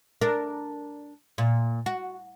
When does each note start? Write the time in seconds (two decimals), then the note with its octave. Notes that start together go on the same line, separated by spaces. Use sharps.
0.21 D4 A#4
1.38 A#2
1.86 F#4